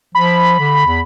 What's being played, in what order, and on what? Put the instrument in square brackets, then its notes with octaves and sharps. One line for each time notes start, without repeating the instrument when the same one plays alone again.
[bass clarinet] F3 [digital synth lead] B5
[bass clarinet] D3
E2